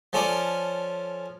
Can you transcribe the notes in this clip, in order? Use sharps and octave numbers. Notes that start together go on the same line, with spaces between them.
F3 C#4 A4 D5